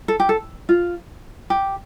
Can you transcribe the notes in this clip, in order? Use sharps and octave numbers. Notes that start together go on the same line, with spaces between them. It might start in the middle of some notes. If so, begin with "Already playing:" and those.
A4
G4
A4
F4
G4